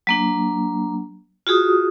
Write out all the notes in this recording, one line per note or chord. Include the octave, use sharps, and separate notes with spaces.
F#3 A#3 D4
F4 F#4 G#4 D#6